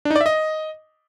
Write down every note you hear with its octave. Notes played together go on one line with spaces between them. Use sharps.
D4
D#4
D5
E5
D#5